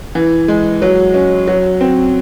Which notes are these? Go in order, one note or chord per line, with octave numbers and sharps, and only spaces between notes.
E3
G#3
F#3
C#4
F#3
C4